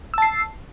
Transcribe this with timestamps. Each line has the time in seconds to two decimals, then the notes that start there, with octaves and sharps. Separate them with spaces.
0.14 E6
0.18 A5
0.22 C7